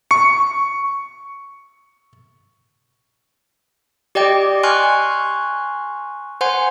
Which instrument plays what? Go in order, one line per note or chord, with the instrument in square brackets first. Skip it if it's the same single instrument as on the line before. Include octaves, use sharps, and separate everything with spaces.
[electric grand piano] C#6 C#7
[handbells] G4 D5 D#5 G5 D6
G#5 C6 C#6 F6 F#6
C5 F#5 G#5 C6